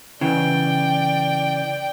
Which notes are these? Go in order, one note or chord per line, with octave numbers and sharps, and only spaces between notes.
C#3 E3 D5 G5